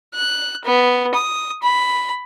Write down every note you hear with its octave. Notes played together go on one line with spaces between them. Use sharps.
F#6
B3
D#6
B5